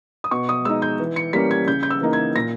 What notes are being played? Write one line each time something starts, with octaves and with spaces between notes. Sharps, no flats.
D#6
B2 C#6
D#6
G#3 D#4 E6
G6
E3
C#7
G3 A#3 C#4 B6
G#6
C#3 G6
G6
E6
E3 A#3 D#4
G#6
A#2 A#6